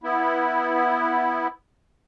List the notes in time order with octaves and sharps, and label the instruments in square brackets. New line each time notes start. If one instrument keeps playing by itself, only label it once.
[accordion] B3 E4